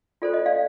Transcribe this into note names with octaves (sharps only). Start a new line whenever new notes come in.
F4 A4 C5 D5
D#5
D5 F5